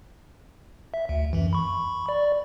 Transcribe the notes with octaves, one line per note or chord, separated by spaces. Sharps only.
E5
D2
F#2 E3
B5 C#6
D5